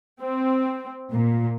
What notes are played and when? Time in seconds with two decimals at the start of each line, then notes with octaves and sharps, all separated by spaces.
0.21 C4
1.09 A#2